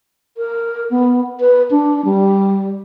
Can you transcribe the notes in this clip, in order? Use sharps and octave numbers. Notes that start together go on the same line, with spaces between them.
A#4
B3
B4
D4
G3